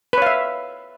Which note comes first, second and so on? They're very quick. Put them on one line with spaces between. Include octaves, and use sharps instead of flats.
B4 C#5 F5 E5